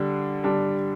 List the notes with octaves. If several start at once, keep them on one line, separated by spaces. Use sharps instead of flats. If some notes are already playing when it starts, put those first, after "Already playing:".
Already playing: D3 G3 D4
D3 G3 D4